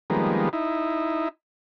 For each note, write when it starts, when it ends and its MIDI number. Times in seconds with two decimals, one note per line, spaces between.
0.10 0.49 51
0.10 0.49 53
0.10 0.49 55
0.10 0.49 56
0.10 0.49 58
0.10 0.49 59
0.53 1.29 63
0.53 1.29 64